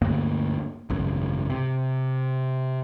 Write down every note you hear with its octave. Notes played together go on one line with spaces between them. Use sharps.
G1 D2 G2 A#3
G#1 C#2 F#2
C3